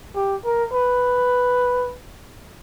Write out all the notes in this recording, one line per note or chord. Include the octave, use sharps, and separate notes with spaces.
G4
A#4
B4